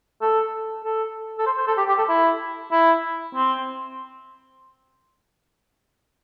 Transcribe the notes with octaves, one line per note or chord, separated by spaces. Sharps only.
A4
A4
A4
C5
C5
A4
G4
G4
A4
E4
E4
C4